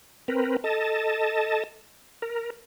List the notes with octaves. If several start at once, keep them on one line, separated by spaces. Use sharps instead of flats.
C4 A#4 B4
A4 D#5 A5
A#4